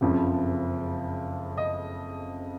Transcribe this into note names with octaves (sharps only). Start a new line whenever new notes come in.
F#1 F2 C#3 F3
D#5